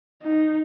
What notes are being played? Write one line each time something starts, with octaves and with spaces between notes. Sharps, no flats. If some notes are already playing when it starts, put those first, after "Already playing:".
D#4